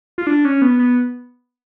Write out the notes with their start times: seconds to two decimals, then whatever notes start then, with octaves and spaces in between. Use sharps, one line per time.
0.18 F4
0.27 D4
0.45 C#4
0.62 B3
0.79 B3